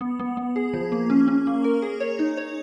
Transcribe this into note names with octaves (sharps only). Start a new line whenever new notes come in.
B3
B3
B3
G#4
F3
A#3
C#4
C#4
A#3
A#4
G#4
C#5
D#4
C#5